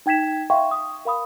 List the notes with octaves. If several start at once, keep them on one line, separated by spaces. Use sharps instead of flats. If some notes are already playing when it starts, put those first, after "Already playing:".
D#4 G5 G#6 B6 E7
E5 F5 G5 C6 C#6
D#6
A#4 F5 B5 D#6